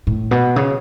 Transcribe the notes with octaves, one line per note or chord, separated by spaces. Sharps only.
A2
B2
C#3